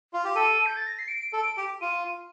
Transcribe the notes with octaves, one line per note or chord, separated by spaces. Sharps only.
F4
G4
A4 D#7
G6
A6
A#6
C7
D7
A4
G4
F4 D#7